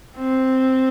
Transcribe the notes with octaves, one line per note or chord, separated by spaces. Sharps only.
C4